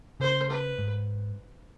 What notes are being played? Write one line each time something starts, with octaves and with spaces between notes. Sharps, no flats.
C#3 C5
B4
G#2